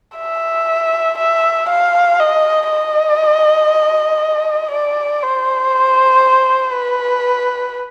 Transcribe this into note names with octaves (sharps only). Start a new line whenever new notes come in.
E5
E5
F5
D#5
D#5
D5
C5
B4